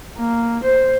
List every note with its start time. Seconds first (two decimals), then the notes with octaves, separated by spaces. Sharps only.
0.17 A#3
0.64 C5